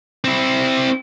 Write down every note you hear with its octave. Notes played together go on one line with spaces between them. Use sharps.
C4 E4